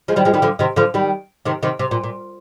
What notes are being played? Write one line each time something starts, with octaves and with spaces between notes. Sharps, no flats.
F3 G#3
D#3 G3
F3 G#3
D#3 G3
D3 F3
C3 D#3
D3 F3
D#3 G3
C3 D#3
C3 D#3
C3
A#2
A#2